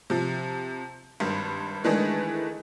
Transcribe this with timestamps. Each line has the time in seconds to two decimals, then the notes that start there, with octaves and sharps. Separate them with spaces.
0.10 C3 F3
1.20 G#1 G2
1.84 D#3 E3 G#3 A3 D4 G#4